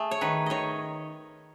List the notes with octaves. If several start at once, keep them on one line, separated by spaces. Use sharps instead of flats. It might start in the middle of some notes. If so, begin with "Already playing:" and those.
Already playing: A3 G#4
C#5
D#3 B4
D#3 C#5 D#5